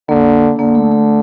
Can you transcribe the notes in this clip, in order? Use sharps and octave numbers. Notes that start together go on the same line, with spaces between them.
D3 A#3
D3 A#3
A3
A3